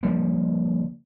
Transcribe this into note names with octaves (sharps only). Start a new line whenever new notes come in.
D3 F3 G3 A#3